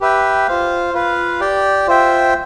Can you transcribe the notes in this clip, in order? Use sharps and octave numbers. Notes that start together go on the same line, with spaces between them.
G4 B4 E5 G5
F4 C5 F5
F4 B4 F5
G4 D5 G5
F4 C5 E5 G5